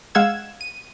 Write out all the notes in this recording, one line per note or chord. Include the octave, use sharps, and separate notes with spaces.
G#3 F5 F#5 E6 G#6 E7
D#7